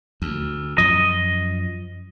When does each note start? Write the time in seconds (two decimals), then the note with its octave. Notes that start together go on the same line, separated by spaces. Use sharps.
0.22 D2
0.78 F#2 F3 D#5